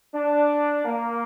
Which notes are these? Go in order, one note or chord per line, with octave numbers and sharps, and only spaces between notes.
D4
A#3